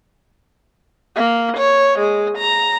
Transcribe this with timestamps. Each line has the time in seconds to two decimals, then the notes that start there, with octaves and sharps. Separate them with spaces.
1.16 A#3
1.57 C#5
1.99 G#3
2.37 A#5